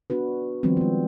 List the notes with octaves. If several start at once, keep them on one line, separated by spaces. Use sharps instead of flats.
B3 D4 F#4 B4
D#3 F3 G3 B3 C4
G#3 B3